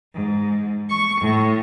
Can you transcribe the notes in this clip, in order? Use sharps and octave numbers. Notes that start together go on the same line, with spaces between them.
G#2
C#6
A2